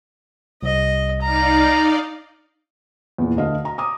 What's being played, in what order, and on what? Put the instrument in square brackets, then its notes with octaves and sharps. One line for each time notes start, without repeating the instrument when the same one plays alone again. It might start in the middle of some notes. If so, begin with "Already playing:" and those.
[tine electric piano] C2 [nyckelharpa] D#5
[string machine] D#4 D5 F5 [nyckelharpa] A#5
[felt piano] E2 A#2
D2 D3 D#5 F5
A#5
A#5 D6 D#6